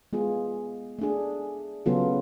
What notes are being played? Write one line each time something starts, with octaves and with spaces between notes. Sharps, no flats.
G#3 B3 F4 G#4
A3 D4 G#4
C#3 F#3 B3 F4 A4